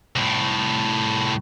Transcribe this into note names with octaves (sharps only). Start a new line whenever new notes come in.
C2 A2